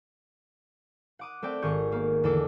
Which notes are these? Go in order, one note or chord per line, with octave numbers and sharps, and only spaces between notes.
F#5 D6 D#6
A3 C4 D5 G5
G#1 D#3 G#4 C#6 G6
A#3 B3
E2 D3 A4 D6